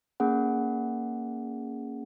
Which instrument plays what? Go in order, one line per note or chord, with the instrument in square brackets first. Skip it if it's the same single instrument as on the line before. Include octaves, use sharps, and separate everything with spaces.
[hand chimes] A#3 C#4 G#4 F#5